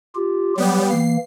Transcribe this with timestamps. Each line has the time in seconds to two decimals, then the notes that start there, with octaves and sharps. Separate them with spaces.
0.15 F4 G4
0.58 F#3 G3 B3 G4
0.90 E3 A#3 C7